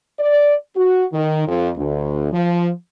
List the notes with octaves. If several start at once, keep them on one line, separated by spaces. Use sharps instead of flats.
D5
F#4
D#3
F2
D2
F3